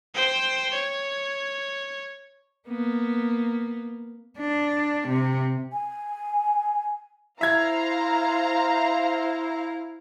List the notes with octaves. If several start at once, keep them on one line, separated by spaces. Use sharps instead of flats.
C5 G5
C#5
A#3 B3
D4
C3
G#5
E4 C5 E5 F5 A#5 G#6